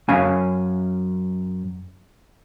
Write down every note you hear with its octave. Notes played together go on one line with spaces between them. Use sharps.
F#2 C#4 F5 G#5